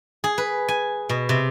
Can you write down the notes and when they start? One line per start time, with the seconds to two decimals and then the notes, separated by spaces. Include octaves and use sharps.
0.24 G#4
0.38 B4
0.68 G#5
1.09 B2
1.29 C3